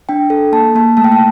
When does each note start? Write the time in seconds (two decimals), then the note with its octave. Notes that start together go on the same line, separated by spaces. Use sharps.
0.09 D4 G5
0.30 A4
0.52 A#3 A5
0.75 A#3 A5
0.97 A3 A5
1.04 G5
1.12 A5